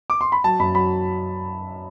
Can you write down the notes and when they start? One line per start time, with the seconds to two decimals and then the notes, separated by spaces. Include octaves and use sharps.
0.10 D6
0.21 C6
0.32 B5
0.44 F#3 A5
0.59 F#2 B5
0.75 F#3 B5